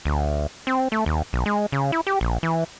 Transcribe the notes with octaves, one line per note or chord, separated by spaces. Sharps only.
D2
C4
A3
D#2
B1
G#3
C#3
E4
G4
A#1
E3